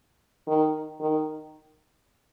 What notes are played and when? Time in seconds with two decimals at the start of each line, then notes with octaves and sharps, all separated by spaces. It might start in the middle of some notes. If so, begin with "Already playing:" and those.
0.47 D#3
1.00 D#3